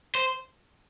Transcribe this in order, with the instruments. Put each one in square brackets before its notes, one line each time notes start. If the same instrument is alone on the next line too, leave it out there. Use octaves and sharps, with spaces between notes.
[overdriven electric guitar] C5